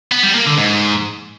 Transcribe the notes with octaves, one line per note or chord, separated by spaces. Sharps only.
B3
G3
A#3
D3
G#2